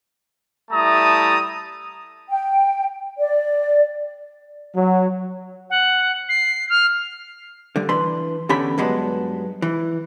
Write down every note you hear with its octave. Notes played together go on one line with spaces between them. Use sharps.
G3 A3 E4 A5 A#5 D#6
G5
D5
F#3
F#5
C7
F6
D3 G3
E3 D4 B4 C6
E2 D3 C#4 G4 B5
G2 F#3 G#3 B3 D4
E3